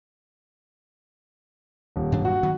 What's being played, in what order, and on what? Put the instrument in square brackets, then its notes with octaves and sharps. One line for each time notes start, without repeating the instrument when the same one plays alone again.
[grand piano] D#1
[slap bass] G2 F#3 D4
[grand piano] F#4
[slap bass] D#3 F#3 B3